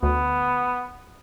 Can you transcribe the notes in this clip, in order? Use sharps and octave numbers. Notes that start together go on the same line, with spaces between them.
D2 B3